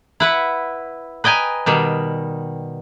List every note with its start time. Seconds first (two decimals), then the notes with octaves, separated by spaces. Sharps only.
0.20 E4 B4 F#5
1.24 B4 D#5 G5 G#5 A#5
1.66 B2 D#3 G3